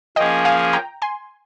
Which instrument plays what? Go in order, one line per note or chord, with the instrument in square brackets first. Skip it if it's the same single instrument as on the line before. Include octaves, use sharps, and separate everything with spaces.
[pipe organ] F3 A#3 C#4 G#4 [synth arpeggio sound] D#5 G5
[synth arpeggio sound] F5 G#5
G5 A#5
G#5 C6